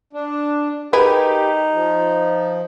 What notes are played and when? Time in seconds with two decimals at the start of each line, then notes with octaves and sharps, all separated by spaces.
0.13 D4
0.93 D#4 G4 G#4 A#4 B4
1.73 F3